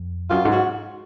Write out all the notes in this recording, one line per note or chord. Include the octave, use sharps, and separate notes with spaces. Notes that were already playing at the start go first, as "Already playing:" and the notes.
Already playing: F2
F#2 F4
G#2
F#4